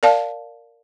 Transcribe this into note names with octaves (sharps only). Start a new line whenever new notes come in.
A#4 D5 F5 A5